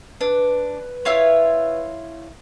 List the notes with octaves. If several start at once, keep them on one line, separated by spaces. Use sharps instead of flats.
D4 B4
E4 F4 C#5